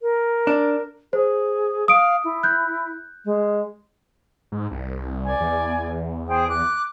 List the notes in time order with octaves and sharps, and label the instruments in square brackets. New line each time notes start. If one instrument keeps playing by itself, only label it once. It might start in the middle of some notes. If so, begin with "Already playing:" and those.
[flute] A#4
[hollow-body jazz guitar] D4
[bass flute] G#4 [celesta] C5
[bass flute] F5 [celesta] D#6 D7
[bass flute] E4
[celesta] F#6 G6
[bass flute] G#3
[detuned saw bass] G#2
C2
[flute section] D5 G#5
[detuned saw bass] E2
[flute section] G#4 C5 G5
D6 F#6